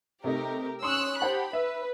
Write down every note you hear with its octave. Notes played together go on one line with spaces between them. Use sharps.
C3 A3 D#4 G4 A#4
C#4 C6 C#6 D#6 E6 F#6
G4 C5 F#5 A5 B5
B4 E5